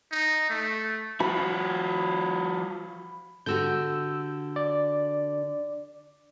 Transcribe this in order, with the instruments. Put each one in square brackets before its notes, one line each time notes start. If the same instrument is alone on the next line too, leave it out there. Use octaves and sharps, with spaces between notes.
[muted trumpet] D#4
A3
[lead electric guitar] F3 F#4 [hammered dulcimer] B5
[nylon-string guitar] D3 F#4 G4 [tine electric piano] E6 G6
[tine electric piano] D5